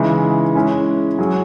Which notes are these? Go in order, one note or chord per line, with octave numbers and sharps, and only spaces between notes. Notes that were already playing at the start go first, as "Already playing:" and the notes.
Already playing: C#3 E3 G#3 D#4
G#3 C#4 E4 G#4
F#3 C#4 G#4